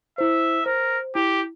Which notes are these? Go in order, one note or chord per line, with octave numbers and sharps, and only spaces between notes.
E4 C5 E5
A#4 C5
E4 G4